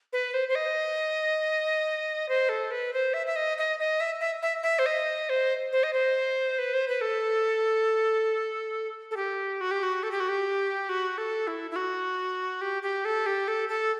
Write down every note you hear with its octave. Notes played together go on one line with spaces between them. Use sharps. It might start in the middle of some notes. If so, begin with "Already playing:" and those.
B4
C5
C5
D#5
C5
A4
B4
C5
E5
E5
D#5
D#5
D#5
E5
E5
E5
E5
C5
D#5
C5
C5
D#5
C5
B4
C5
B4
A4
A4
G4
F#4
G4
F#4
A4
G4
F#4
G4
F#4
A4
E4
E4
F#4
G4
G4
A4
G4
A4
A4